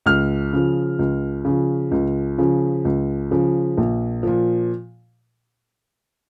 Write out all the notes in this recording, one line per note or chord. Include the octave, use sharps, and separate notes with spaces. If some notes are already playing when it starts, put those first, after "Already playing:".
C#2 F6
C#3 F3
C#2
C#3 F3
C#2
C#3 F3
C#2
C#3 F3
A#1
A#2 F3